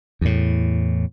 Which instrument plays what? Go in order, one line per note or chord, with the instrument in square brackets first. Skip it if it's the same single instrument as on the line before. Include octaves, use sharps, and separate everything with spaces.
[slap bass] E2 A2